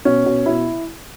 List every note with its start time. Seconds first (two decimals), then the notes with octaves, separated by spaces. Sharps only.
0.05 B2 C#4
0.26 B2
0.46 B2 E4